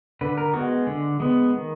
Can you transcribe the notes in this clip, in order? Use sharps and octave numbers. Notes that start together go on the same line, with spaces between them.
D3 B4
A#4
G#3 B3 F#4
D3
G#3 B3
D#3